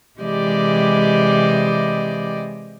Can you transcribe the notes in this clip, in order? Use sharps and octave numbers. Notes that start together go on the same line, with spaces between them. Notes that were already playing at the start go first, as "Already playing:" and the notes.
C3 E3 G#3 G4 D5 D#5